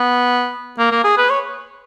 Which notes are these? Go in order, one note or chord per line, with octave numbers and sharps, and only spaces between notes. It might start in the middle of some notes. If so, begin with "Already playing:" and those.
Already playing: B3
A#3
A#3
G#4
B4
C#5